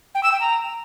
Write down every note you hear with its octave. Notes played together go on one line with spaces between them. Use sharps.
G5
E6
G5
A#5